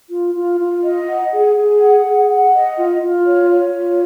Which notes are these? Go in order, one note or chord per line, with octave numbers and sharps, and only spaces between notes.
F4
F4
F4
D#5
F#5
G#4
G#4
F#5
G#4
F#5
D#5
F4
F4
C#5
C#5
F4